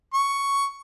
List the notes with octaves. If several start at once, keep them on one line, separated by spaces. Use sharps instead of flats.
C#6